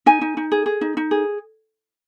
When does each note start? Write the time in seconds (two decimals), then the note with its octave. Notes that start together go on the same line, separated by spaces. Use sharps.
0.06 D#4 G#5
0.21 D#4
0.37 D#4
0.52 G#4
0.66 G#4
0.81 D#4
0.97 D#4
1.11 G#4